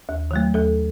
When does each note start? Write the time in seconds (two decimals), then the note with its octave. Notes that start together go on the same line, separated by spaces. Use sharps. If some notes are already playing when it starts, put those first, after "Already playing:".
0.09 D#2
0.31 D#3 F#3 A3
0.54 D#2 A4